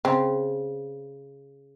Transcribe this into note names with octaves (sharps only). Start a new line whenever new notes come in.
C#3 C4